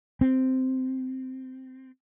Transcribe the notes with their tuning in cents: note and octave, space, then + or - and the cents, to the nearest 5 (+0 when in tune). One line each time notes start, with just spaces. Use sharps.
C4 -10